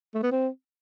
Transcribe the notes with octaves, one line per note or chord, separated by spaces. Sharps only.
A3
B3
C4